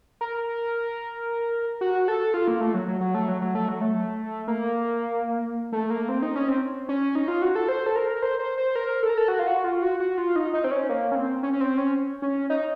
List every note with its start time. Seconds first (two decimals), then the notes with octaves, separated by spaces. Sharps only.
0.21 A#4
1.81 F#4
2.08 A4
2.34 F4
2.48 A#3
2.61 A3
2.74 F#3
2.88 F#3
3.01 F#3
3.14 A3
3.28 F#3
3.41 F#3
3.55 A3
3.68 F#3
3.81 A3
4.48 A#3
5.72 A3
5.90 A#3
6.09 C4
6.22 D#4
6.36 C#4
6.48 C4
6.89 C#4
7.15 D#4
7.28 F4
7.42 F#4
7.56 A4
7.69 C5
7.86 A4
7.96 A#4
8.22 C5
8.39 C5
8.58 C5
8.76 A#4
9.03 A4
9.09 A#4
9.18 A4
9.28 F#4
9.39 F4
9.47 F#4
9.64 F4
9.83 F#4
10.00 F#4
10.18 F4
10.36 D#4
10.53 D#4
10.64 C4
10.71 C#4
10.89 A#3
11.12 C#4
11.15 C4
11.43 C#4
11.53 C#4
11.61 C4
11.78 C#4
12.22 C#4
12.50 D#4